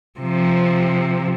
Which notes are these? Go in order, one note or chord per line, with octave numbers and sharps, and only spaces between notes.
C3 F3